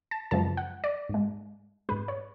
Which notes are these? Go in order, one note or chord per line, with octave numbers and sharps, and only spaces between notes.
A5
F#2 C#3 F3 G#3 A5
F#5
D5
G#2 G#3
G#2 G#3 B4
C#5